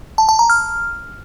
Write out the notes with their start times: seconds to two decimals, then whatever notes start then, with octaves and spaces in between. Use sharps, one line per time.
0.18 A5
0.29 A5
0.39 A#5
0.50 F6